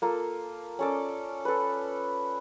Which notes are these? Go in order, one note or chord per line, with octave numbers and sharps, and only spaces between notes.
A#3 F4 A4
C#4 A4 D5
A4 B4